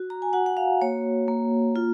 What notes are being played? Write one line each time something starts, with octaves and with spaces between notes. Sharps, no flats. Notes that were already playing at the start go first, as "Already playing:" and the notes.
Already playing: F#4
A#5
G#5
F#4 F#5
F#5
F5
A#3 C#5
A#3
F4